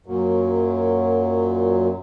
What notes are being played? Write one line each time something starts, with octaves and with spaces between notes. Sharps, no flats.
F#2 A#2 F#3